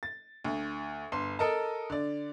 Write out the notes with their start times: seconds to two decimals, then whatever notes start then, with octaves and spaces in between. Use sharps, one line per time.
0.03 A6
0.45 D2
1.12 G1 C6
1.39 A4 A#4 D#5 A5
1.90 D3 D5